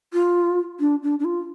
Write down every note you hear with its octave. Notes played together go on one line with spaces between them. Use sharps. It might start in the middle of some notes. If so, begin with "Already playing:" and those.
F4
D4
D4
D4
F4